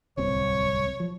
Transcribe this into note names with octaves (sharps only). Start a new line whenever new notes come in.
D1 C2 C4 C#5
F3